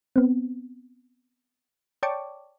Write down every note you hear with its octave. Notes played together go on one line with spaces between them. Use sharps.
B3 C4
C#5 D5 G5 A5 C#6 D6